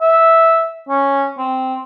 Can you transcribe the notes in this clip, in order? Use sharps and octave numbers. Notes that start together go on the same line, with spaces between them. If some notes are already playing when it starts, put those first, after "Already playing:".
E5
C#4
C4